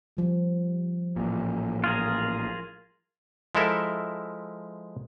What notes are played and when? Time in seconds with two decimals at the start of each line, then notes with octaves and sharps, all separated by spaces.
0.17 F3 G3
1.16 A1 A#2
1.84 F4 G#4 A#4
3.55 F3 G#3 E4 A4 A#4 E5